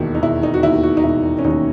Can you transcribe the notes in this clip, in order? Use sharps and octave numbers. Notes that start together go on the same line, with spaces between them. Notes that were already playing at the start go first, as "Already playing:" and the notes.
Already playing: E1 D#2 D#3 E4 F#4
D#4
E1 E4
D#4
F#4
D#2 D#3 E4
F#4
D#4
E1 E4
C#4
D#2 D#3 D#4